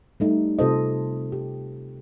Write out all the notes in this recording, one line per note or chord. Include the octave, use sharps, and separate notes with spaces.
G3 A3 D#4
C3 F4 A4 C5 D#5
G4